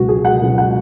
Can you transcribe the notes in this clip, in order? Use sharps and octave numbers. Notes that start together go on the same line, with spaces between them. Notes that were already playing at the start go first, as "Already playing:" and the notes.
Already playing: C#2 B2 F#3 F#4
G#4
F#5
C#2 B2 F#3
F#5